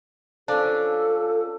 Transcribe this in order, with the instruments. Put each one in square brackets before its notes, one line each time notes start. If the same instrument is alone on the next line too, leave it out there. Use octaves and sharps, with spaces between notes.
[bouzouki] F3 C#4 [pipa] D4 [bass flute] A4